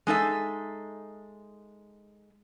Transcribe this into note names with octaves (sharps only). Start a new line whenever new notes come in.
G#3 D#4 A4 E5